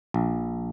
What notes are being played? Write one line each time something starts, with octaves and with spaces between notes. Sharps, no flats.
A#1